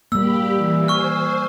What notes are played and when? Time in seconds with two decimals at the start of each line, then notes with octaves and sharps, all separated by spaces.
0.12 G3 A#3 G4 B5 E6
0.57 E3
0.88 C5 G#5 C#6 F6